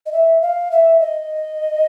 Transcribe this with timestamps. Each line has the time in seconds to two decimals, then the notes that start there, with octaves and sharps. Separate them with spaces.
0.06 D#5
0.12 E5
0.42 F5
0.71 E5
1.00 D#5